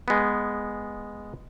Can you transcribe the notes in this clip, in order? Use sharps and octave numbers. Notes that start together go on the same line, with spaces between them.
G#3 B3